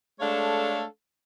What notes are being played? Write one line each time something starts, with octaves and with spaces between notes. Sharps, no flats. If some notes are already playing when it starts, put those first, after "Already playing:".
G#3 A3 D4 A4 C#5 F5